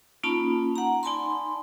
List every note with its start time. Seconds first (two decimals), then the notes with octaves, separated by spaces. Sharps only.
0.23 A#3 C#4 D#4 F4 A5 B5
0.76 F#5 A#5
1.03 D#4 D5 G#5 A5 B5 C6